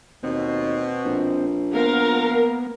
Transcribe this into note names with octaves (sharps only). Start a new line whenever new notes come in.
D#2 B2 C4
A#1
F3 A#3 B3 F#4 A#4 F5